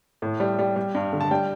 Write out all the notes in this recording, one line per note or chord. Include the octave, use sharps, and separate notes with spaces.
A2
G3
G3
G3
G2
D3
A5
G3 G5